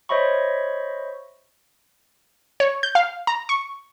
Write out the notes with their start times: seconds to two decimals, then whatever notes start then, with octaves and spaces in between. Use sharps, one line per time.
0.09 C5 C#5 D#5 E5 B5 C#6
2.60 C#5
2.83 G6
2.95 F5
3.27 A#5
3.49 C#6